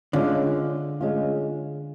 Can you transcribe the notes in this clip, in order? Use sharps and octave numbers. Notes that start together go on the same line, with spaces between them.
D3 G#3 C#4 F4
G#3 C#4 F4